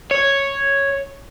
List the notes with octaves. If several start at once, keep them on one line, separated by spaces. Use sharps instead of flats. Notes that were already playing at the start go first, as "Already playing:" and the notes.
C#5